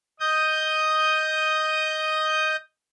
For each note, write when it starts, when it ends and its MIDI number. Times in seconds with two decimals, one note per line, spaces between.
0.20 2.56 75
0.20 2.56 87
0.20 2.56 91